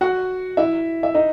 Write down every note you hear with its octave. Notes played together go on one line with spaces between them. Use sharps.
F#4 F#5
E4 E5
E5
D#4 D#5